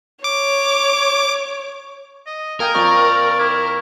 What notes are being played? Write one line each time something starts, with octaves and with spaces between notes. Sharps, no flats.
C#5 D6
D#5
A#4 F5 G5 G#5 D#6
F2 D5 C#6
E4 D6 G#6